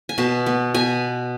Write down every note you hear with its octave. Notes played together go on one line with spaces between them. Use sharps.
G#5
B2 A5
B3
B2 G#5